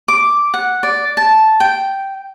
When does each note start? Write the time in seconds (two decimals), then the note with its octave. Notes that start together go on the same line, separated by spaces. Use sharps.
0.08 D6
0.54 F#5
0.83 D5
1.17 A5
1.60 G5